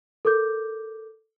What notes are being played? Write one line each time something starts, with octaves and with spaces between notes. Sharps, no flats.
A4 A#4 D6 G6